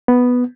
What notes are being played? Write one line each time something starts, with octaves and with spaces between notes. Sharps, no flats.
B3